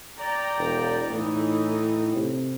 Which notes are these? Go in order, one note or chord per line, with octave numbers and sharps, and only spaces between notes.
D5 G5 A#5
E1
A2 E3 D#4
C3